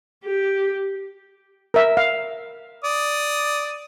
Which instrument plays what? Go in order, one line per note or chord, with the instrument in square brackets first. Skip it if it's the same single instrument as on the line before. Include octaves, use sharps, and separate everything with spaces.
[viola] G4
[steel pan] A#4 E5
F5
[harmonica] D5 D#6